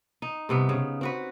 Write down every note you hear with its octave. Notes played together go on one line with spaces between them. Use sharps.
D#4
G2 C3 B3
C#3
C4 F#4 B4